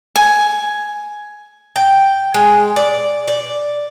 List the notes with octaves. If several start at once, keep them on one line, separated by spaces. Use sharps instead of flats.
G#5
G5
G#3
D5
D5